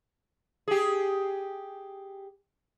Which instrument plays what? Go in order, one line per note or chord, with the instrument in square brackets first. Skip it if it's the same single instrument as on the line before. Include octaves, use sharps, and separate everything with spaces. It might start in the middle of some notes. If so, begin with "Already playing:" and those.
[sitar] G4 G#4